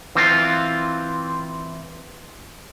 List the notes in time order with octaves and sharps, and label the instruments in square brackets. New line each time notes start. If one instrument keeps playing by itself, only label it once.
[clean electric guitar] E3 C4 F4